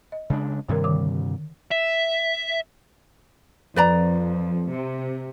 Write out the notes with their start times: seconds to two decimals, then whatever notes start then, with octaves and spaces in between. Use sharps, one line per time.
0.12 D#5
0.30 C#3 G#3 D4
0.69 G2 C3 D#3 G3 A#4
0.84 D3 D#3 D6
1.71 E5
3.76 F2 B4 D5 A#5
4.71 C3